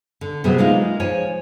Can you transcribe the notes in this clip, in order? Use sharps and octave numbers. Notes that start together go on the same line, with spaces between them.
D3
C3 F#3 B3 G#4
G#3 A#3 D#4 F4
F3 C#5 G#5